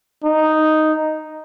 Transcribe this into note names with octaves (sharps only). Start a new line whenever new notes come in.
D#4